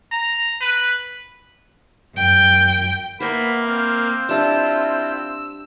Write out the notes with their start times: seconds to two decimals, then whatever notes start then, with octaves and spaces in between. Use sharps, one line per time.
0.12 A#5
0.61 B4
2.14 F#2 G5
3.20 A#3 B3 C5 E5 B5
3.64 C4 F5
4.29 G3 D4 E4 F4 E6